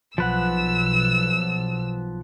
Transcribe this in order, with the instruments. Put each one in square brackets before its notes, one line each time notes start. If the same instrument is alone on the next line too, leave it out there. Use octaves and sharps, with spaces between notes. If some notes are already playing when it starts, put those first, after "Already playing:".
[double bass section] B1 [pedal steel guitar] F3 B4 F#5 [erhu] E6